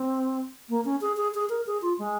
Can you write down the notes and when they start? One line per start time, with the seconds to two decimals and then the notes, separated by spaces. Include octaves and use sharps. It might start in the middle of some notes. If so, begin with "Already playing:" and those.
Already playing: C4
0.69 A#3
0.85 C#4
1.01 G#4
1.17 G#4
1.34 G#4
1.50 A#4
1.67 G#4
1.82 F4
1.99 G#3